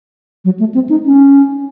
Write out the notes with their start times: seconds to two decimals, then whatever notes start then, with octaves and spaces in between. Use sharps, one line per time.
0.45 F#3
0.59 A3
0.74 C4
0.89 D#4
1.05 C#4